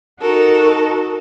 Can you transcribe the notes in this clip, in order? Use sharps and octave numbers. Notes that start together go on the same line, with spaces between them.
D#4 F#4 A4 A#4